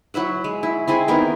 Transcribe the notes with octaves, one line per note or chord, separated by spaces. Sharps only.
F#3 E4 E5 F#5
G#3
E4
C4 E4 G#4 G#5
D#3 B3 E4 A#4